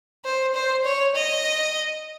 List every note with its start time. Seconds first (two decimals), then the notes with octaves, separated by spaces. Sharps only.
0.25 C5
0.54 C5
0.85 C#5
1.15 D#5